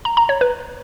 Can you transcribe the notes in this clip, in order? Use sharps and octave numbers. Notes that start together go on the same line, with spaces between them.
A#5
A#5
C#5
B4